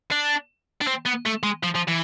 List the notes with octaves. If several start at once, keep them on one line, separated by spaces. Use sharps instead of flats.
D4
D4
C4
B3
A3
G#3
F3
F3
E3